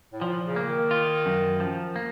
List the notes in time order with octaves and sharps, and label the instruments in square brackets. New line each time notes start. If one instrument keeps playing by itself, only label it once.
[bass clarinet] A2
[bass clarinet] A#2 [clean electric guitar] F3
[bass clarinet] C#3
[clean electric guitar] A#3
[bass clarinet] D#3
[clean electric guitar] F4
F#2
F3
A#3